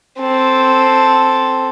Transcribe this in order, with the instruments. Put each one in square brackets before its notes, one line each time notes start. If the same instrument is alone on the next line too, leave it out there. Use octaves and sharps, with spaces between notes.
[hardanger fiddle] C4 A4